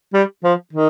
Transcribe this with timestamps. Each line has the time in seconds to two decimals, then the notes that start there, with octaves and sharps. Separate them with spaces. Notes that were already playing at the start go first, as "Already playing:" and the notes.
0.14 G3
0.44 F3
0.73 D#3